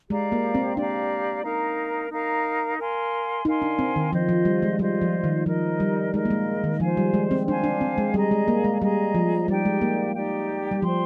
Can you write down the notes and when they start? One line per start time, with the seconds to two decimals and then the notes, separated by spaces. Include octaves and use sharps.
0.10 G#3 G4 D5 F5 A#5
0.32 A#3
0.55 C4
0.77 D4 G4 D5 F5 A#5
1.44 D#4 A#4 F5 A#5
2.11 D#4 A#4 F5 A#5
2.78 A#4 F5 G#5 C6
3.45 D#4 A#4 F5 G#5 C6
3.62 D4
3.79 C4
3.96 D#3
4.13 F3 F4 C5 D#5
4.29 F3
4.45 G3
4.62 G#3
4.79 G3 F4 C5 D#5
5.01 F3
5.24 D#3
5.46 F3 D#4 A#4 D#5
5.80 G3
6.13 G#3 D#4 A#4 D#5
6.25 A#3
6.30 G#3
6.64 D#3
6.80 F3 C5 F5 G#5
6.97 G3
7.14 G#3
7.31 C4
7.47 D4 C5 F5 G#5
7.64 D4
7.81 C4
7.98 G#3
8.14 G3 G#4 D#5 A#5
8.31 G#3
8.48 A#3
8.64 G#3
8.81 G3 G#4 D#5 A#5
9.15 F3
9.48 G3 D#4 G4 D5 G5
9.65 G#3
9.81 A#3
10.15 D#4 G4 D5 G5
10.71 G3
10.82 F3 C5 G5 C6